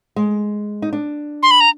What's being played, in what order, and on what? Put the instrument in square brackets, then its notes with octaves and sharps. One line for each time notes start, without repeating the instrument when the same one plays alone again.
[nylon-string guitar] G#3
D#4
D4
[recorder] C6
B5
A#5